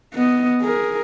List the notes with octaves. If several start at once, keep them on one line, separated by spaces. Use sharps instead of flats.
B3 D#5
G#4 A#4